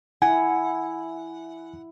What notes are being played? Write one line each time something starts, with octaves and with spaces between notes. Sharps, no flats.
E4 F#5 G#5